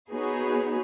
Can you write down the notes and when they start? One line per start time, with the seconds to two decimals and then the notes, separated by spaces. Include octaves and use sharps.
0.12 B3 D#4 F#4 G#4 B4 C#5